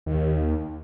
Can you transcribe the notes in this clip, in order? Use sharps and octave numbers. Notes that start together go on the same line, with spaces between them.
D#2